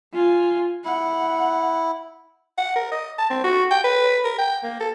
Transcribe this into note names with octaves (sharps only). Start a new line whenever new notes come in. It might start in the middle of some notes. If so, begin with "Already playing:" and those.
F4 G#5
E4 F#5
F#5
A#4
D#5
A5
C4
F#4
G5
B4
A#4
G5
A#3
A4